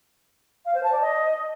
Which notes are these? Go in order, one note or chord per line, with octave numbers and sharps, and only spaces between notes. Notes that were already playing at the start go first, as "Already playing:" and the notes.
F5
C5
A5
D5
D#5